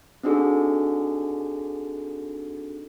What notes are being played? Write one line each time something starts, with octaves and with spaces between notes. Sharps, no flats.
C4 D4 D#4 F#4 G#4 A4